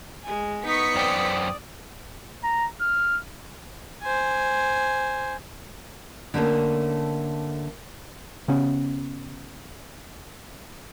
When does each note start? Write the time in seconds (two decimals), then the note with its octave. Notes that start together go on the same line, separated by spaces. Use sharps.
0.25 G#3 G#5
0.65 B3 D#4 C#6 D#6 B6 C#7
0.95 F#2 C5 D5 G5
2.44 A#5
2.81 F6
4.02 C5 G#5
6.34 D3 A3 A#3 C#4
8.48 C#3 B3 C#4